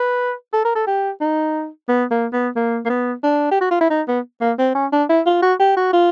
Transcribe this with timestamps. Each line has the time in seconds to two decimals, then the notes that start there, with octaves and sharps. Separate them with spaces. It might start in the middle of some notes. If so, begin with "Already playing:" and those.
Already playing: B4
0.53 A4
0.65 A#4
0.75 A4
0.87 G4
1.21 D#4
1.88 B3
2.11 A#3
2.33 B3
2.56 A#3
2.85 A#3
2.89 B3
3.23 D4
3.51 G4
3.61 F#4
3.71 F4
3.81 E4
3.90 D#4
4.08 B3
4.41 A#3
4.58 C4
4.75 C#4
4.92 D4
5.09 E4
5.26 F4
5.42 F#4
5.60 G4
5.77 F#4
5.93 F4